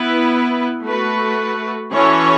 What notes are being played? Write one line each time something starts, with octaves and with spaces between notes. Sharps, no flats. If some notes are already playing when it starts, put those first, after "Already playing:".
Already playing: B3 E4 B4
A3 F#4 B4
E3 C#4 F#4 A4 C#5